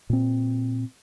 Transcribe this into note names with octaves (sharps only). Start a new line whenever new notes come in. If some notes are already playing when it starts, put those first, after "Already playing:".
A#2 C4